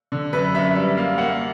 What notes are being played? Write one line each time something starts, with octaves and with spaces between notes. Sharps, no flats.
D3
F#2 B4
F#2 E5
G3 E5
A#3 F5
A#3 F#5